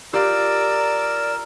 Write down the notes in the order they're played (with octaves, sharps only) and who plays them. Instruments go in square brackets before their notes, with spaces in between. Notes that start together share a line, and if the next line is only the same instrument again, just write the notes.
[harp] F4 G4 F5 [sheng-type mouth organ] A#4 E6 [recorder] D5